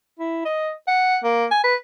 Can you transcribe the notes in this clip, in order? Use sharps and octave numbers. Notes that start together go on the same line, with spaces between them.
E4
D#5
F#5
A#3
G#5
B4